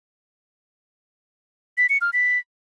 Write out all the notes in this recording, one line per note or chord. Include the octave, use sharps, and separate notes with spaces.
B6
C#7
F6
B6